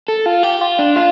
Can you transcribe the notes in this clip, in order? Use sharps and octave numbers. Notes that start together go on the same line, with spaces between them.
A4
F4
G4
F4
D4
F4